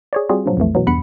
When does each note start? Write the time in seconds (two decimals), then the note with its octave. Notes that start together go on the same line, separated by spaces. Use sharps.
0.13 G#4 C#5 D5
0.29 G3 C4 F4 F#4 G#4
0.46 G2 A#2 F3 F#3
0.57 B1 F2 E3 A3
0.75 B2 E3 F#3
0.87 E2 G2 F#5 B5 C#7